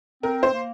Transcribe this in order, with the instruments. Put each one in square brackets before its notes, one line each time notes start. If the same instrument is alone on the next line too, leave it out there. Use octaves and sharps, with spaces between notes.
[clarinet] C4 [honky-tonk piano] A#4
[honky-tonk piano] C5
[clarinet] A#3